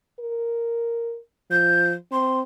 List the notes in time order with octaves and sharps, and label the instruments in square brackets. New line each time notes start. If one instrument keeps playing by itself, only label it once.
[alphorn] A#4
[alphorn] F3 [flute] G6
[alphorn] C4 [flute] C6